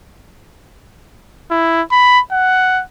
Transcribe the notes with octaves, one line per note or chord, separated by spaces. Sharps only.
E4
B5
F#5